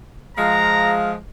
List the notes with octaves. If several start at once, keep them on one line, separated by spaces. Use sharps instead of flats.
F3 G#3 F5 A#5